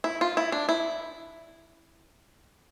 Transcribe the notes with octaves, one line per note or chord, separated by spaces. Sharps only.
E4
F4
E4
D4
E4